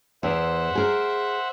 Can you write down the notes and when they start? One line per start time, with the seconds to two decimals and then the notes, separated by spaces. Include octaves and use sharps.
0.23 E2 C5 E5 F#5
0.75 G#4 A#4